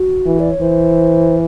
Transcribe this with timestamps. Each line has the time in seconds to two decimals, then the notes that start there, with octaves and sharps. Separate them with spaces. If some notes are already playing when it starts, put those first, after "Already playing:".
Already playing: F#4
0.25 E3
0.39 D5
0.51 C#5
0.61 E3 C5